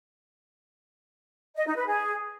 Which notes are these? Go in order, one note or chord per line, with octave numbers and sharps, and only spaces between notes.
D#5
D#4
B4
G#4